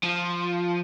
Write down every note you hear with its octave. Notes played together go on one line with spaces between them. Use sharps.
F3